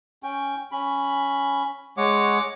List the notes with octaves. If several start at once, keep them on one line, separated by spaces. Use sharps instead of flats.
C#4 G5
C#4 B5
G#3 C#5 F#5 D6